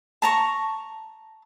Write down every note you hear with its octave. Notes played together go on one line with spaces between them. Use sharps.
A5 A#5 C#6